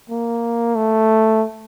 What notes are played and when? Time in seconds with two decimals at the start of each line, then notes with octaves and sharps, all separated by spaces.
0.10 A#3
0.75 A3